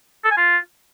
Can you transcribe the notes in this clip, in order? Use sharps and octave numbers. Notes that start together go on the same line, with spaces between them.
A4
G#5
F4